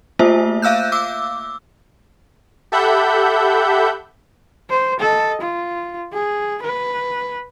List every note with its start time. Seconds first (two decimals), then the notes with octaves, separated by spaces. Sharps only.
0.19 A3 A#3 F4 C5 E5
0.62 E5 F5 E6 F#6 G6
0.92 D6 E6
2.72 G4 A4 E5 F#5 B5 G6
4.70 C5
5.00 A4 D#5
5.41 F4
6.13 G#4
6.62 B4